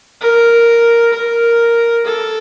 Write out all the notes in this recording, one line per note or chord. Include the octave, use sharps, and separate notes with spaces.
A#4
A#4
A4